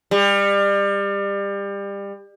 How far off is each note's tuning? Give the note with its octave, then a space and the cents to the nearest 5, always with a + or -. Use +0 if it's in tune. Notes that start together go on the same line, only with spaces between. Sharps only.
G3 +30